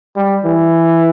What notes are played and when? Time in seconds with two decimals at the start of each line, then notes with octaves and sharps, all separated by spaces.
0.16 G3
0.45 E3